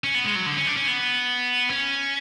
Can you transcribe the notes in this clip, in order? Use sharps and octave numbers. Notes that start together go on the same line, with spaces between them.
C#4
B3
G#3
F#3
D3
C#4
D4
C#4
B3
C#4